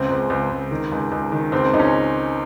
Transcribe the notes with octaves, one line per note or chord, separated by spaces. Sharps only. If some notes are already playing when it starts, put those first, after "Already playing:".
Already playing: C#2 C#3 C4
C#2
C#2
C#2
D#3
C#2
C#2
D#3
C#2 C4
C#2 D#4
C#4